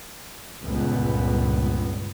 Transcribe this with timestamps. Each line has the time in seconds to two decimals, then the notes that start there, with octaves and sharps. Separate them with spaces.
0.63 G1 C#2 A#2 B3